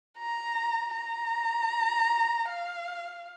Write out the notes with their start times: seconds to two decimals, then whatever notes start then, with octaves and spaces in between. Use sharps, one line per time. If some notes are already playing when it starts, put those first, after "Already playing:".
0.18 A#5
0.95 A#5
2.49 F5